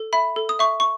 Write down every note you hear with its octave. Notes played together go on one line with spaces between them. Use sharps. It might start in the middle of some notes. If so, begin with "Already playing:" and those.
Already playing: A4
E5 B5
A4
D#6
E5 C#6
C#6